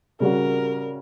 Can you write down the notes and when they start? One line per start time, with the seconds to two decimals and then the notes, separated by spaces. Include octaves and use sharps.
0.20 C#3 G3 C#4 F#4 A#4